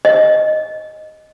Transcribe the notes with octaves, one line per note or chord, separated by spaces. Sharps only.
D#5